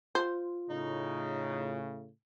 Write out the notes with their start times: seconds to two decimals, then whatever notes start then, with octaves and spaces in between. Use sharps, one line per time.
0.15 F4 C5
0.70 A2 C#3 D#4